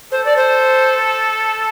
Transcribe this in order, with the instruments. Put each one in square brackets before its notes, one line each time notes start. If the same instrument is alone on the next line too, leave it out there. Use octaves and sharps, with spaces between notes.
[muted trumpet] A4 [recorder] C5
[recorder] D5
C5